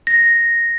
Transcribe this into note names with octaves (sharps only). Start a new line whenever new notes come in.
A#6